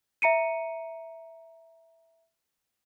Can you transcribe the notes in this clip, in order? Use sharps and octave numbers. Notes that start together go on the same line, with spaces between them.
E5 A#5 C#7 D#7